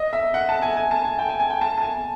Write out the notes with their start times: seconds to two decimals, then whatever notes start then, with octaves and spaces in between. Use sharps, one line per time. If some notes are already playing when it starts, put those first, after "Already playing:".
Already playing: D#5
0.13 E5
0.34 F#5
0.49 A5
0.62 G#5
0.77 G#5
0.91 A5
1.05 G#5
1.19 G5
1.29 G#5
1.40 G#5
1.50 G5
1.61 A5
1.78 A5
1.82 G#5